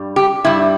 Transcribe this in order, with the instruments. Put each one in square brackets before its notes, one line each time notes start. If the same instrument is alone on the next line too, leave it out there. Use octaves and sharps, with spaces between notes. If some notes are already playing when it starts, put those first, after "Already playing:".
Already playing: [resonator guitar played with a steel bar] G2 G3
G4
G2 G3 E4